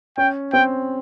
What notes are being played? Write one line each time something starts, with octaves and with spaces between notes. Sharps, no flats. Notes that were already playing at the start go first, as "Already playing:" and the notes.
C#4 G5
C4 G5